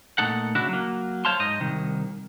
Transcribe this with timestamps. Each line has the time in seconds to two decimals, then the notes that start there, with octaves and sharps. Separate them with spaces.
0.18 A#2 A3 D#4 A4 F#5
0.55 C#3 D4 E4 F#4
0.69 F#3 A#3
1.25 C5 C#5 F5 A5 C6
1.39 G#2 D#4 D#5
1.61 C2 D#3